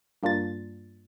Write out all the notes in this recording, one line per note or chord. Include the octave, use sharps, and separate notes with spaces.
G2 A#3 D4 F4 A6